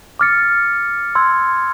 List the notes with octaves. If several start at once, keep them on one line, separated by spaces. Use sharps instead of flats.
D6 F6 A6 C#7
C6 E6 G#6